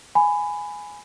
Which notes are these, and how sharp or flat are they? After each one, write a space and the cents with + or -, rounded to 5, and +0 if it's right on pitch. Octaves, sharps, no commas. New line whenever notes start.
G#5 +0 B5 +15